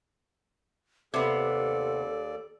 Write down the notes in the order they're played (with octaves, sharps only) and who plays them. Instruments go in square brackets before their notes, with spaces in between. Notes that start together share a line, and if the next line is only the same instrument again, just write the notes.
[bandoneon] D#2 D5 [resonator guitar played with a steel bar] C3 B3 [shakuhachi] A4